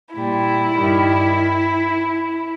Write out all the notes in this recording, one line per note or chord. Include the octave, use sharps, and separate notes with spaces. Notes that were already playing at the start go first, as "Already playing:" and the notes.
A#2 G3 E4
G2 D#3 G3